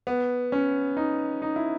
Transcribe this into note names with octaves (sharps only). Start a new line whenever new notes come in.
B3
C#4
D#4
D#4
E4